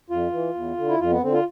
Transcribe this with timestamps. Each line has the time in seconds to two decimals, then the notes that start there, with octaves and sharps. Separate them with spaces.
0.10 F2 F4
0.32 E3
0.54 E2
0.77 D3
0.88 E4
0.99 F2 F4
1.10 B3
1.22 D3 C4
1.32 F4